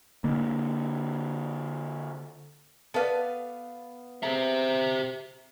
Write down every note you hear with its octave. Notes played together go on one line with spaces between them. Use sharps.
D3 A#3
B3 A4 B4 D5 F5
C4 G4 G#4 E5 A#5